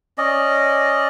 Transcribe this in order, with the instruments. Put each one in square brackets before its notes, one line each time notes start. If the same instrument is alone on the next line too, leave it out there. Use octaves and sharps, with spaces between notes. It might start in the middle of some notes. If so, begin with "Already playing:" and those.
[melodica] C#4 D5 D#5